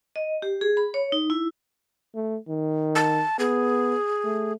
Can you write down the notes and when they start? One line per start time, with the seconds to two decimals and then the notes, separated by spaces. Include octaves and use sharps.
0.16 D#5
0.42 G4
0.61 G#4
0.77 B5
0.94 C#5
1.12 D#4
1.30 E4
2.15 A3
2.48 D#3
2.95 A5
3.39 B3 G#4
4.24 A3